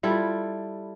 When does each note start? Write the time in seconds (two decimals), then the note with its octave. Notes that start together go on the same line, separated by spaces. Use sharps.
0.03 G3 E4 F4 A4